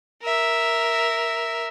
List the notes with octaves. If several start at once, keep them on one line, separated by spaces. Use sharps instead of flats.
A#4 E5